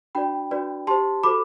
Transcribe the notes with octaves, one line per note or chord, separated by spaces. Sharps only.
D4 F#4 B4 D5 G5 B5
D4 F#4 B4 D5
G4 C5 A5 C6
F#4 A4 C5 B5 D6